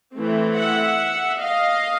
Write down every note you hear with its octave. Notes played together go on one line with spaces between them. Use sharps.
E3 A3 C4
E5 F#5
D#5 F5